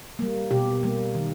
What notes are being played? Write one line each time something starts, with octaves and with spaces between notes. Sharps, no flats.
G3 A#3
B2 G4
G3 A#3
D#3